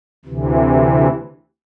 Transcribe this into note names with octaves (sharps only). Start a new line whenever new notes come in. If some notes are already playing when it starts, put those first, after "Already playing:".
D2 C3 E3